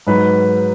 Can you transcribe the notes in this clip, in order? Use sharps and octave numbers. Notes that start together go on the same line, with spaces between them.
G#2 F#3 B4